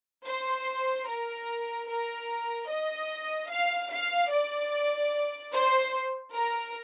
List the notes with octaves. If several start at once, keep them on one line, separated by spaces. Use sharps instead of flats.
C5
A#4
A#4
D#5
F5
F5
D5
C5
A#4